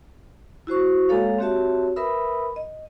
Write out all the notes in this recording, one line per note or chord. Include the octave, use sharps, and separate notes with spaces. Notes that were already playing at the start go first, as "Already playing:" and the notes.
E4 F#4 C5 C#6
G#3 A#3 A4 C#5 F5
C4 F#4 G4 C#5 E5 A5
A#4 B4 E5 B5 D#6 E6
D#5